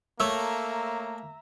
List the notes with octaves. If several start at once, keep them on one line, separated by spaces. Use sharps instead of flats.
A3 A#3 C#5 E5 A#5 E6